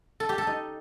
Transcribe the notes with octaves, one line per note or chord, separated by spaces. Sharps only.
A4
G4
A4
D#4